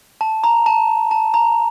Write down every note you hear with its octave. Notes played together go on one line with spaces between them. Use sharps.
A5
A#5
A5
A5
A#5